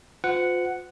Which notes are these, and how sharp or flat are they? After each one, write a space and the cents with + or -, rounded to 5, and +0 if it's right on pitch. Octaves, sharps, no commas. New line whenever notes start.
F4 +35 C5 -40 F#5 +0